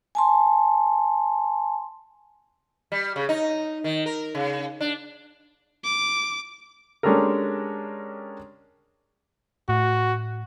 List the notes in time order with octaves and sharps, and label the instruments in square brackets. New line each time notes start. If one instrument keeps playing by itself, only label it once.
[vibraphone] G#5 A5 C6
[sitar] G3
C#3
D#4
D#3
A#4
C#3
D4
[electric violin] D6
[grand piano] G#3 C#4 D4 G4 A4 A#4
[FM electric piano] A2 [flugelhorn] F#4